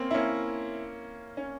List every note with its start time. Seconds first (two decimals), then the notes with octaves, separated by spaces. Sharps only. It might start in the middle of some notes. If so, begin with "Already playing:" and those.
Already playing: A#3 C4 C#4
0.11 E4
0.14 A#3 C#4
1.37 C#4